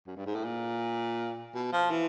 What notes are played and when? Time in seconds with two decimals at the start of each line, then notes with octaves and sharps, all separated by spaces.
0.07 F#2
0.17 G2
0.26 G#2
0.35 A2
0.44 A#2
1.55 B2
1.73 F3
1.91 E3